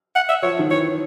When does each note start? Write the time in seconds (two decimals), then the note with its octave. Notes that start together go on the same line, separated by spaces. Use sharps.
0.16 F#5
0.29 E5
0.43 F3 C#5
0.59 D#3
0.71 E3 C#5